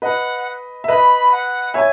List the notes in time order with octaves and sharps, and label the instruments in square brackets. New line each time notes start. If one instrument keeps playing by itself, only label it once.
[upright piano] B4 D#5 [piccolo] F#5
[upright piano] E5
[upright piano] B4 D#5 [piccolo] B5
[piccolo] F#5
[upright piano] C#5 E5 [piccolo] G#5